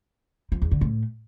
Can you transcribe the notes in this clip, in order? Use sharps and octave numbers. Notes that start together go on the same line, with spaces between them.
F3
E2
D3
A2